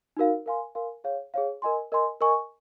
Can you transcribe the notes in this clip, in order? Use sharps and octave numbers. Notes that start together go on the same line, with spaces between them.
D#4 F#4 A#4 F5
A#4 F5 G#5 C6
A#4 F5 G#5 C6
G#4 C#5 F5
G#4 C#5 F5
A#4 D#5 G#5 C6
A#4 D#5 G#5 C6
A#4 D#5 G#5 C#6